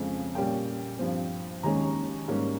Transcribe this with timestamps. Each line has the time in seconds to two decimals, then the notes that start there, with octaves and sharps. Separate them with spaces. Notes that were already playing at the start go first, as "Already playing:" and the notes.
Already playing: F2 C#3 F3 G#3
0.35 A#2 G3 A#3 C#4 G5
0.99 G2 F3 C4
1.63 D#2 D#3 G#3 C#4 A#5
2.28 G#2 G3 A#3 C#4